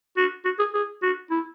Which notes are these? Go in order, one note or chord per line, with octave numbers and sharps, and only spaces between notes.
F#4
F#4
G#4
G#4
F#4
E4